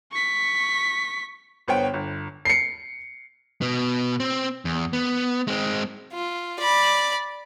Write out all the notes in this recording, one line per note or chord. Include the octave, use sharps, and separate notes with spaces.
C#6 B6
G1 B3 C5 C#5 G5
G1
C7 C#7
B2 B3
C4
E2
B3
G#3 C4
F4
D5 B5